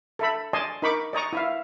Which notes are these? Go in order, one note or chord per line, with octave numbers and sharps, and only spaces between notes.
A4 E5 B5
D5 D#5 G#5 A5 C6
D#4 A#4 B5 C#6 D6
D5 D#5 A#5 C#6
E4 E5 F5